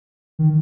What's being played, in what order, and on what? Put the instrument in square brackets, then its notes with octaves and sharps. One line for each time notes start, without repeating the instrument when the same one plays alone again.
[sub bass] D#3